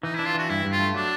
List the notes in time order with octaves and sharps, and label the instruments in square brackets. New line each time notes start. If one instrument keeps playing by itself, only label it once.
[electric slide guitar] E3 [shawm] D#4
[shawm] E4
[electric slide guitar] D4
[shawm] F4
[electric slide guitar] E3 [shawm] F#4
[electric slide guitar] G2 [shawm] E4
[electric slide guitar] G2
[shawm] F4
[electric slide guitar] A3
[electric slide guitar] F#3 [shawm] D4